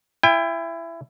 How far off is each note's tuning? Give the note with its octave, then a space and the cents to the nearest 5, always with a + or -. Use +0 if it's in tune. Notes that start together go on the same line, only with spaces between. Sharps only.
E4 +20 G5 +40